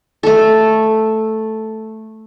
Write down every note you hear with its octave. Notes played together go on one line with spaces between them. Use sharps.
A3 A4